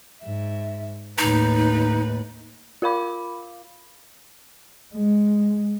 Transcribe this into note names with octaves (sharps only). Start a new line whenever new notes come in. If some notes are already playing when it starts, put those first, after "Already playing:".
G#2 E5
D#2 A2 D#4 B4
F4 A#4 F5 B5 D6
G#3